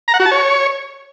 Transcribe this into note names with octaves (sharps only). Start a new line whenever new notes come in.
A#5
F#5
F#4
A5
C#5